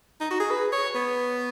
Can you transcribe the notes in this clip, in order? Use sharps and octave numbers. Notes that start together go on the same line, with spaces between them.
D#4
F#4
G#4
B4
C#5
B3